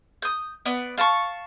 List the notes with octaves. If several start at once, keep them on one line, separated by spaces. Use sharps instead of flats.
D#6 G6
B3 D5
F5 A5 A#5 C#6